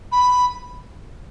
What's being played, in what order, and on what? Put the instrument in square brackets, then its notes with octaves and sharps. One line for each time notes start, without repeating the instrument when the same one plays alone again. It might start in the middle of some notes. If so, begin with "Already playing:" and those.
[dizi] B5